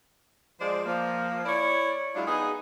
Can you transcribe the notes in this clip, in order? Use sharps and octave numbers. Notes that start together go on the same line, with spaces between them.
F3 G#3 C5 D5
F3 A#3
E4 C#5 D5
F#3 G#3 D4 E4 F4
B3 D#4 G#4